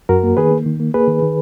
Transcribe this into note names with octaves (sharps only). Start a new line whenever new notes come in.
F#2 F#4 A#4
A#3
D#3 G#4 B4
A#3
D#3
A#3
A#3 G#4 B4
D#3
D#3